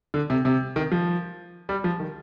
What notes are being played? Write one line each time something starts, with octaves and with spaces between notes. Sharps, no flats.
D3
C3
C3
D#3
F3
G3
F3
D#3